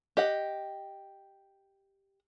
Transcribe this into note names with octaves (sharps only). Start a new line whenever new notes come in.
G4 D#5 F#5